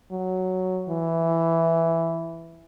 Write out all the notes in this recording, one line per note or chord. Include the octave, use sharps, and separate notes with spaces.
F#3
E3